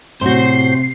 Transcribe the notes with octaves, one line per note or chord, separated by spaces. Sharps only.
A2 C3 F#4 C5 C7